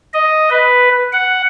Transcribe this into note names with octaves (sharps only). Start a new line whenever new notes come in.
D#5
B4
F#5